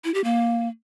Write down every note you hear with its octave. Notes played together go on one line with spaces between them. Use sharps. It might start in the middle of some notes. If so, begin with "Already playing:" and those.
E4
G4
A#3